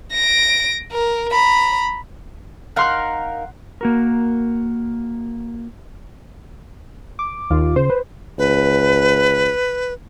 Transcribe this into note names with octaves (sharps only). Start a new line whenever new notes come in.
A#6 D7
A#4
A#5 B5
D#4 A#4 F5 F#5 C6 F#6
A#3 F#4 A#4
D6
D#2 F4
C#3 C5
B4
C#2 B4